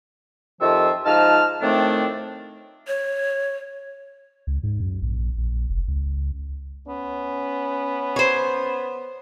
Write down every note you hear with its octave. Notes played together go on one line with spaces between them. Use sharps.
F2 C3 D#3 F3 F4 E5
G#2 F3 D#4 A5 F6
A2 D#3 F3 A3 C4 D4
C#5
C#2
G#2
F#2
A#1
A#1
F1
C#2
B3 C#4
C5 C#5